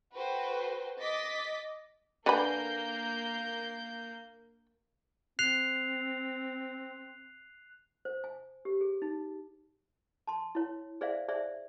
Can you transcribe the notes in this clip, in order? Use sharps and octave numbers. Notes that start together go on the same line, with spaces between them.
F#4 A4 B4 C5 G5
D#5 D6 A6 B6
D3 A#3 B4 G#5 B5 G6
C4 F#6 C7 F7
C5
G#5
G4
G#4
D#4
A5 C6
E4 C#5
G#4 C5 D5 E5 F5
G#4 C5 D5 E5